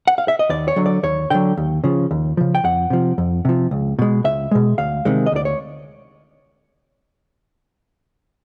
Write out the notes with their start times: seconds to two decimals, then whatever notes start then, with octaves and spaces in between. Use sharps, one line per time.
0.07 F#5
0.18 F5
0.28 E5
0.39 D#5
0.49 D#2 D5
0.68 C#5
0.76 D3 F#3
0.86 D5
1.03 D#2 C#5
1.30 D3 F#3 G5
1.57 D#2
1.84 C#3 F3
2.11 D#2
2.37 C#3 F3
2.55 G5
2.64 F2 F#5
2.90 C3 F3
3.18 F2
3.45 C3 F3
3.71 C#2
3.99 B2 G#3
4.24 C#2 E5
4.51 B2 G#3
4.78 D2 F5
5.05 C3 D#3 G#3
5.26 D#5
5.32 D2 D5
5.45 C#5